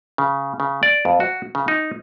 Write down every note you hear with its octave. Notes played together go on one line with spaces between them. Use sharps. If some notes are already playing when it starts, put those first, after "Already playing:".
C#3
C#3
D5
F2
F#4
C#3
D#4